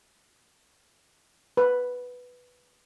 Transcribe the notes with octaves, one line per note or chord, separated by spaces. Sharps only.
B4